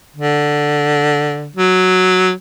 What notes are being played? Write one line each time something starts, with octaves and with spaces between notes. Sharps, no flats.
D3
F#3